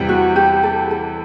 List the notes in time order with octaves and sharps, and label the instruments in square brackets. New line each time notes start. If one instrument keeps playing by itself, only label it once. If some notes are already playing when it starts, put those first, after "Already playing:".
Already playing: [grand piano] E2 C3 E3 G3
[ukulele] F#4
G4
A4
A4